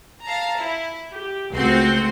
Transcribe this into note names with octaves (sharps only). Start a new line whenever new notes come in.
F5 A5 A#5
E4
G4
C#2 A3 C4 F#4 C6